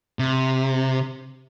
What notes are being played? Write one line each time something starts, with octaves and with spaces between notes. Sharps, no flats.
C3